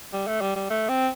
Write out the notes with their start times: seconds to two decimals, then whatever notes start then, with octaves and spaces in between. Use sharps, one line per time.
0.13 G3
0.27 A3
0.41 G3
0.56 G3
0.70 A3
0.89 C4